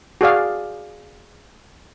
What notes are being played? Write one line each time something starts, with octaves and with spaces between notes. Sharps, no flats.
F#4 G#4 D5 F5